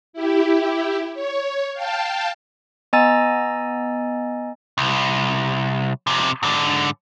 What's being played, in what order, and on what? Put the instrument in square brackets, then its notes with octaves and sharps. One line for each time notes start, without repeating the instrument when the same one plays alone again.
[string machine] E4 G4
C#5
F5 G5 A5
[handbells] B3 D#5 G#5 A#5 E6 A6
[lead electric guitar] C2
F2 C3
G#2 D3